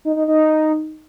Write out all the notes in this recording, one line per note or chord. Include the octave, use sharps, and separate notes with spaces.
D#4
D#4
D#4